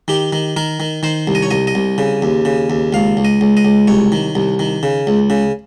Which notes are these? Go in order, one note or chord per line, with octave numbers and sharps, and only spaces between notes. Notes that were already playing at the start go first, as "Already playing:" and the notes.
D#3 G4
D#3
D#3 A#4
D#3
D#3 C5
C2
D#5
C#5
C2 D#5
D#5
C2
C#3
D#2
C#3
D#2
C#2 F5
C#2
D#5
C#2
D#5
C#2
C2 C#5
D#3
C2
D#3
C#3
C#2
C#3